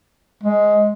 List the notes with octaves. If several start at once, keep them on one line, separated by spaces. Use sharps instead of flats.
G#3